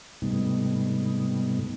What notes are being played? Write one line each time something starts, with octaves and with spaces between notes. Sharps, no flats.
G#2 C3 G3 A3 B3 D#4